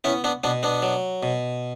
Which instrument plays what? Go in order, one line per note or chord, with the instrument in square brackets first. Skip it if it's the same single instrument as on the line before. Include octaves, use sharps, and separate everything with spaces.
[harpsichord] B3 C#4 E4
B3 D4
B2 B3 D4
B3 D4
F#3
B2